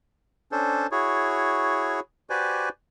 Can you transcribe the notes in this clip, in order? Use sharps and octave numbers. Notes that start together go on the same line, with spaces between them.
C#4 D4 A4 C5
E4 F#4 G#4 C#5
F#4 G4 B4 C5 D5 G#5